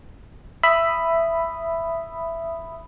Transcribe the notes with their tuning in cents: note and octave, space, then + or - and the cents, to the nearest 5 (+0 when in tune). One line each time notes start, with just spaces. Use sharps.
E5 +10 B5 +5 D#6 +0